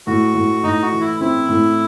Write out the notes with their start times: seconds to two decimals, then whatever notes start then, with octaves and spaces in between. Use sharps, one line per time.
0.07 A2 F#4
0.35 A2
0.63 A2 D#4
0.82 F#4
0.92 E3
1.01 E4
1.21 C4 E4
1.49 A2